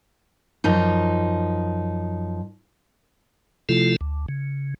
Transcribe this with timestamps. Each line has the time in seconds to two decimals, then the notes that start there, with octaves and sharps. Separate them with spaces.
0.64 F#2 F3 D#4
3.69 C3 F3 A3 E4 F4 A4
4.01 D2
4.28 C#3